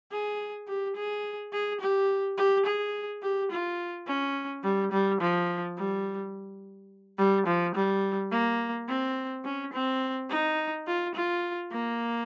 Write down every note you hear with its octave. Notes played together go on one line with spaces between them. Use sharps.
G#4
G4
G#4
G#4
G4
G4
G#4
G4
F4
C#4
G3
G3
F3
G3
G3
F3
G3
A#3
C4
C#4
C4
D#4
F4
F4
A#3